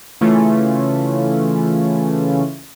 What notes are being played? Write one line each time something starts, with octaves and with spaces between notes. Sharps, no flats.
C#3 E3 A3 C#4 F4